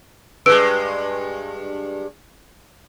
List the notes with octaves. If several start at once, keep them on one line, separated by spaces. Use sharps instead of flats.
G2 G#3 B4 E6 D7